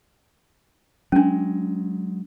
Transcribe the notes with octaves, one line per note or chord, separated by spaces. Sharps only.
F#3 G#3 C#4 D4